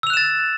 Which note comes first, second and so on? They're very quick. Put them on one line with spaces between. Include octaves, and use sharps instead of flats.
E6 F7 F#6 E7 A6